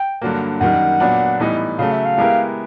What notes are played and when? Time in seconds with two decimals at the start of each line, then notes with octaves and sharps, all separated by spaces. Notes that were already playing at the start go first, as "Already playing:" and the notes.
Already playing: G5
0.22 G2 D3 F#3 A#3
0.61 F#2 D#3 G3 F#5
1.00 A#2 F#3 B3 D4
1.39 A2 E3 G3 B3 D#4
1.79 C#3 F#3 A3 F5
1.92 E5
2.05 F5
2.18 G#3 B3 E4 G4 A#4